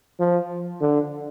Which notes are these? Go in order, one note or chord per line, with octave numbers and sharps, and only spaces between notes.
F3
D3